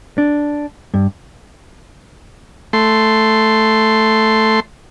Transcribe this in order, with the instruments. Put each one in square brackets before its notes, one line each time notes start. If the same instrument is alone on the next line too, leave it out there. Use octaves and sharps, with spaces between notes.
[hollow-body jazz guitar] D4
G2
[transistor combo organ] A3 C6